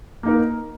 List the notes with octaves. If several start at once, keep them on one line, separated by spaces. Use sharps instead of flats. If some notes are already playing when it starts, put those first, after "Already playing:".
A#3 D#4 A#4